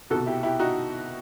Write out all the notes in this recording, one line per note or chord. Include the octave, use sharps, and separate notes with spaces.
C2 B2 F#4 A4
E4 G4
E4 G4
D#4 F#4